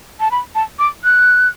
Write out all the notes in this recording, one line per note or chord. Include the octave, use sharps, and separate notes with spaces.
A5
B5
A5
D6
F#6